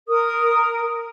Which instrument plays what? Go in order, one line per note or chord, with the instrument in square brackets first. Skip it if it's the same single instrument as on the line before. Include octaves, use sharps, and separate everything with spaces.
[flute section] A#4 D#6